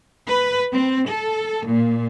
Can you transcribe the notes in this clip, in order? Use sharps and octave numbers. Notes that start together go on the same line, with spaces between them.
B4
C4
A4
A#2